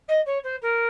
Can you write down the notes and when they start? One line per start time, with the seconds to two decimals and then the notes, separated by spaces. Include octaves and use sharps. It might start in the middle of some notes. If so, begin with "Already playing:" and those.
0.08 D#5
0.26 C#5
0.43 C5
0.61 A#4